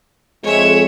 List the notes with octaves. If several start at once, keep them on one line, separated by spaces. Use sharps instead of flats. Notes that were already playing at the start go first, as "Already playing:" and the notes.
F2 G#3 C#5 E5